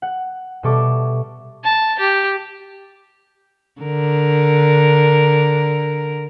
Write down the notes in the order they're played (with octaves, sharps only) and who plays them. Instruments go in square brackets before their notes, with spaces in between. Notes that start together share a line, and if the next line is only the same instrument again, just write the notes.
[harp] F#5
B2 G3 A4 E5 C#6 D6
[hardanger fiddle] A5
G4
[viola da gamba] D3 A#4